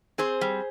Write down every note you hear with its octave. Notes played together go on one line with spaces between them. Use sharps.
C4 G#4 C5
G3